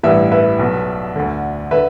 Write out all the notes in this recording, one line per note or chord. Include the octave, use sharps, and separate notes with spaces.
A1 G2 E3 B4 E5
B4 E5
B1 B2
D2 D3
D3 B4 E5